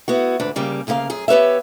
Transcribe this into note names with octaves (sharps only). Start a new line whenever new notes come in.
B3 E4 F#4
D2 G#2 D4 B4
D2 C#3 G3 A#3
D2 C#3 A#3 A4 F5
F#2 G#4
B3 G4 B4 C#5 E5